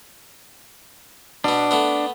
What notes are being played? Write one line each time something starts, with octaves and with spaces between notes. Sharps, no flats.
B2 B3 D4
A3 B3